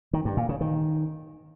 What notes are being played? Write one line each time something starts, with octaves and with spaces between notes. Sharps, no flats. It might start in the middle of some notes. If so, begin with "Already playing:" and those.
D#3
G2
A#2
C#3
D#3